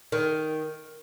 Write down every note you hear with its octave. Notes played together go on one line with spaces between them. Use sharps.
D#3